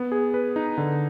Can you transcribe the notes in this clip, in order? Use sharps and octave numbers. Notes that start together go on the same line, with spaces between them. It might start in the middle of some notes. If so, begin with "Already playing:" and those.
Already playing: B3
G#4
B4
D#4
D3